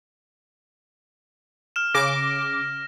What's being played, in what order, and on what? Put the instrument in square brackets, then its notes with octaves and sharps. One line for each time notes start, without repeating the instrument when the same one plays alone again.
[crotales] F6 E7
[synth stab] C#3 D6 [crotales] A#6